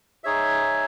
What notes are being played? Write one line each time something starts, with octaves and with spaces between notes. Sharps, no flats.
D#4 G#4 C#5 E5